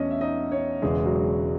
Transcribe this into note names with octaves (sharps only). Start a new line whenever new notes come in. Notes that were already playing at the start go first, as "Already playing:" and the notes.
Already playing: E2 B2 A3 C#4 C#5 D#5
E5
D#4 D#5
C#4 C#5
E1 E2 C#3 E3 G#3 G#4
F#3 F#4